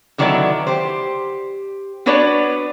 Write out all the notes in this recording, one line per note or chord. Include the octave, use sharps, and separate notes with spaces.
D3 D#3 F#3 B3 D4 E4
G4 C5
B3 D4 F#4 B4 C#5 D5